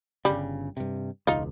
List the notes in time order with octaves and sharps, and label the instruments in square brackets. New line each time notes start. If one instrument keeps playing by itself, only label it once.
[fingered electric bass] G1 C#3 [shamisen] G3
[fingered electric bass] G2 C3
[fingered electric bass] E1 C#2 [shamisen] D#4 F4